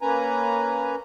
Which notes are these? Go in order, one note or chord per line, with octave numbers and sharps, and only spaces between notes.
A#3 C#4 B4 G#5 A#5